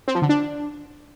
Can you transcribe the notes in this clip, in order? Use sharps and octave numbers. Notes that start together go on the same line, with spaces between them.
C4
F3
D3
D4